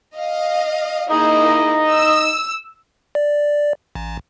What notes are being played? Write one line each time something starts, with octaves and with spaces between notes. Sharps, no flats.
D#5 F5
A#3 D#4 E4 G#4 D#5
E6
D5
A1